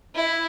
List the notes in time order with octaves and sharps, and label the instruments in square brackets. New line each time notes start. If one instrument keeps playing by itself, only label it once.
[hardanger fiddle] E4